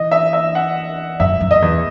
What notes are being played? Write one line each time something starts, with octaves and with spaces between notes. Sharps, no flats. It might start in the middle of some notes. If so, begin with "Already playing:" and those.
Already playing: E3 D#5
E5
E5
F#5
F#2 E5
F#2
D#5
E2